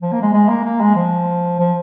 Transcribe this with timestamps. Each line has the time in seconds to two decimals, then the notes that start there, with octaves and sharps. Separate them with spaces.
0.02 F3
0.12 A#3
0.22 G#3
0.33 G#3
0.48 A#3
0.64 A#3
0.81 G#3
0.96 F3
1.59 F3